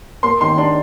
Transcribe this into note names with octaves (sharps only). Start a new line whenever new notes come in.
A#3 C6
D#3 C6
D4 C6